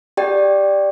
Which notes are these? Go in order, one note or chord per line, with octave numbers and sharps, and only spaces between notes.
G4 D5 G5